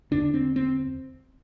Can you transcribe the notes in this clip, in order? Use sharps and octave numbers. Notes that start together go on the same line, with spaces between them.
E2 D3 D4
C4
C4